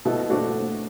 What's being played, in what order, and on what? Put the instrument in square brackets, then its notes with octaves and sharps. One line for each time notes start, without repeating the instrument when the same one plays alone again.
[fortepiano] B2 E4 A4
A3 D4 F#4